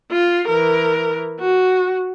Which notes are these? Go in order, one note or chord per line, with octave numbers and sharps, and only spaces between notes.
F4
E3 A#4
F#4